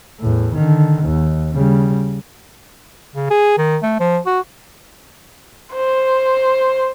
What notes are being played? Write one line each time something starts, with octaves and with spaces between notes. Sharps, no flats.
E2 A2
D3 D#3
D#2
C#3 G3
C#3
G#4
D#3
A3
F3
F#4
C5